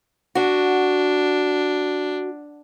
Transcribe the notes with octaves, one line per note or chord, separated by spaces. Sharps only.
D4 F#4